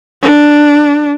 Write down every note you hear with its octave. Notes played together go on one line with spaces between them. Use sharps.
D4